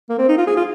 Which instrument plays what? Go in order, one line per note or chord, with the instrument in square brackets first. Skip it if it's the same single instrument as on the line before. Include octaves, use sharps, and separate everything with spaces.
[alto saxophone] A#3
C4
D#4
F4
G#4
F4